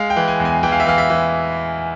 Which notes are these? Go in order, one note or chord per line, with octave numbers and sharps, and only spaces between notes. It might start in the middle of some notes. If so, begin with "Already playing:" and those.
Already playing: G#3 F5
G5
E3
G#5
E2
G#5
E3 G5
F5
E5
E3 F5
E5
E3